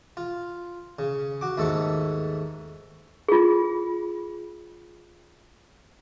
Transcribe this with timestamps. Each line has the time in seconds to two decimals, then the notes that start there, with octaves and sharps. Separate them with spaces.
0.17 F4
0.99 C#3
1.41 F#4 D6
1.57 D#2 G#2 A3 A4 C#6
3.28 F4 G#4